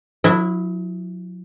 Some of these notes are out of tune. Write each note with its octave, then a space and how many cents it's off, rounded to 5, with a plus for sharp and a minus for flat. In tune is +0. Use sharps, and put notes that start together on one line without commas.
F#3 -40 E4 +0